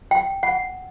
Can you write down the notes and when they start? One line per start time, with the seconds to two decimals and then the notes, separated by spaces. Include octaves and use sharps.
0.11 G5
0.43 F#5